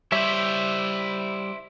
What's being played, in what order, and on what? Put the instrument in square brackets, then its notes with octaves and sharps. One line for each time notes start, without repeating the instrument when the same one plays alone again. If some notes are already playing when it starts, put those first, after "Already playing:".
[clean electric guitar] G3 C#5 E5 [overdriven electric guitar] E4 C5